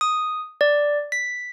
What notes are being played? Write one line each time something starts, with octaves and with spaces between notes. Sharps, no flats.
D#6
D5
B6